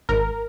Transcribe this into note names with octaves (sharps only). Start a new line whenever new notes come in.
G#1 A#4